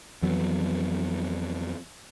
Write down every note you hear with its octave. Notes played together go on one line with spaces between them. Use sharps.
F2 E3 F#3 B3